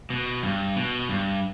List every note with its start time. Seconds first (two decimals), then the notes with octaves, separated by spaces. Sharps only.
0.10 B2
0.43 G2
0.76 B2
1.09 G2